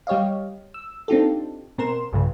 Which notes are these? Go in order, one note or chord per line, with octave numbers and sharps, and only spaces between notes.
G3 G4 C#5 D#5 F5
E6
C4 D4 D#4 F4 G4 A4
B2 C4 A#4 C6 E7
B1 E2 G2 C#3